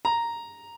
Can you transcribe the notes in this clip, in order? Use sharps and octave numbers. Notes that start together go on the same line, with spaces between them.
A#5